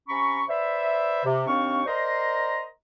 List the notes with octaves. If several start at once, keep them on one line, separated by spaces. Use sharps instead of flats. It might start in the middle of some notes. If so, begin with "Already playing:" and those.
C3 C#4 A#5 B5 C#6
B4 C5 D5 E5
C3
D#2 C4 D4 F5 C#6
A#4 C5 D5 D#5 A#5 C6